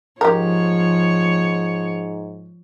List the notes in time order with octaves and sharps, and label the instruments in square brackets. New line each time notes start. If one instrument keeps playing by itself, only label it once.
[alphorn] G#2 [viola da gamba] F3 C#5 [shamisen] G4 A#4